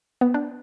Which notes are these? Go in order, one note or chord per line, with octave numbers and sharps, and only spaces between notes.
B3
D4